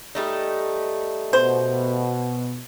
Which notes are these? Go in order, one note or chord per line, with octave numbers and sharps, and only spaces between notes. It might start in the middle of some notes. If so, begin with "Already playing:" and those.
G3 A3 D#4
B2 C5